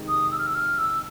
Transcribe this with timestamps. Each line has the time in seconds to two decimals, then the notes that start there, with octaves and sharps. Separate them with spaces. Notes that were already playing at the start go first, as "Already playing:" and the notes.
Already playing: F2 C3 D#3 G#3
0.08 D#6
0.31 E6
0.39 F6
0.47 E6
0.55 F6
0.78 E6